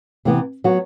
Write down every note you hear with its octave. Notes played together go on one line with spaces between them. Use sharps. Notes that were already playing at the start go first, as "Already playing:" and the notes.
C3 E3 B3
F#3 B3 F#4